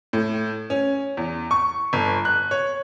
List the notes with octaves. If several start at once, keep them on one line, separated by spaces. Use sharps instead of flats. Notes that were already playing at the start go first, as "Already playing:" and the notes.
A2
C#4
E2
C#6
G1
F#6
C#5